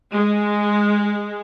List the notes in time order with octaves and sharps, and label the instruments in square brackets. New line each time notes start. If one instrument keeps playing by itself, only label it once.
[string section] G#3